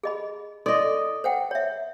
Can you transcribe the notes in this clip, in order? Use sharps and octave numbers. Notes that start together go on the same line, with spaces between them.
G#4 D#5 B5
A4 D5 D#5 C6
C5 F#5 G5
C#5 E5